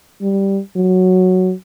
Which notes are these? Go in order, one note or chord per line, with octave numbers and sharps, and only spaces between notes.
G3
F#3